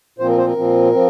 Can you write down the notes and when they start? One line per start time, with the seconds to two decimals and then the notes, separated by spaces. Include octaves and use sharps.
0.18 A#2 F3 C4 C5
0.28 A#4
0.37 C5
0.47 A#4
0.56 A#2 F3 C4
0.93 F3 C4